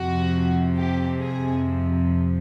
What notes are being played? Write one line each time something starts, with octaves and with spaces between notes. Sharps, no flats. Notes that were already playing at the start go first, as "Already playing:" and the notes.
Already playing: F2 C3 F3 F#4
G4
G#4